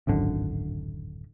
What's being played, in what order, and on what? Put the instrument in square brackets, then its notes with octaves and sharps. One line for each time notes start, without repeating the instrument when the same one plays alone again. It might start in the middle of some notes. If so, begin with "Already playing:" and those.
[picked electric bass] D1 G#1 F#2 D3